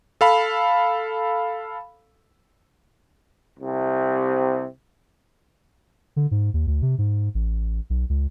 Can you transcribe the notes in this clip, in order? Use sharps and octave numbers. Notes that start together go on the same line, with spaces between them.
A4 F5 B5
C2 C3
D3
G#2
D#2
D2
C3
G#2
A1
B1
C#2